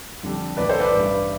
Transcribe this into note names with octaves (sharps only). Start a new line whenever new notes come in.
F2 D3 G3 D4
B1 A2 E3 B3 B4 D5
A4 C5
B4 D5
A1 G2 E3